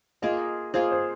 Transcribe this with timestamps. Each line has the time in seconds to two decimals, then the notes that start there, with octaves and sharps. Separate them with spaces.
0.22 A#3 F4 G#4 D#5
0.74 A#3 F4 G#4 C5
0.91 C5